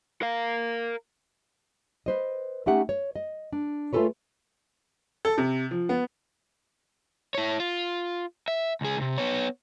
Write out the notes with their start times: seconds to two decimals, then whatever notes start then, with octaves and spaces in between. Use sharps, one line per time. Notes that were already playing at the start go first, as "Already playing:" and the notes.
0.22 A#4 F5
2.06 B4 C5 D#5
2.66 A3 C#4 D#4 G4 E5 F#5
2.89 C#5
3.16 D#5
3.52 D4
3.93 A3 F4 G#4 A4 B4 C#5
5.25 A4
5.38 C3
5.71 F3
5.89 B3
7.35 E4 C#5
7.60 F4
8.48 E5
8.81 C#2 G#4
8.97 C#2 C3
9.18 B3 C#5